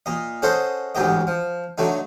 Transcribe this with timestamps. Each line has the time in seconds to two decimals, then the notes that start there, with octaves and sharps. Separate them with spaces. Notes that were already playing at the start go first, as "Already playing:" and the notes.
0.06 A#2 D#5
0.42 C#4 G#4 A4 C5 D#5 F#5
0.95 A1 D2 G#2 F#3 G4 D#5
1.27 F3
1.78 D3 F#3 A3 D#4